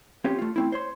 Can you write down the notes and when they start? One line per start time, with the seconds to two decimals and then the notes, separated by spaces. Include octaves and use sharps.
0.24 C4 C#4 F4 G4 C#5
0.39 A3 F4
0.56 A3 C4 E4
0.72 C5 C#5 C6